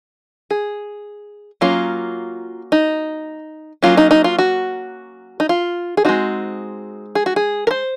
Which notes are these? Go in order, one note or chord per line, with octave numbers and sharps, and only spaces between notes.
G#4
F#3 A#3 C#4 F4
D#4
F#3 A#3 C#4 F4
D#4
D#4
F4
F#4
D#4
F4
G#4
G#3 C4 D#4 F#4
G#4
F#4
G#4
A#4
C5